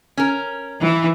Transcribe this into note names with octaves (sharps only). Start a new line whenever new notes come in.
C#4 A#4
E3